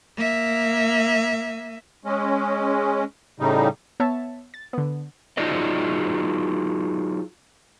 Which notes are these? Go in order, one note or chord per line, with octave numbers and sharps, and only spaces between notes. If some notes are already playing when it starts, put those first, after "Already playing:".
A#3 E5
G#3 C#4
A2 C#3 G3 D#4
B3 C#5 E5 A5
A6
D3 B3
F#3 D#4 F4 G#4 D5 D#5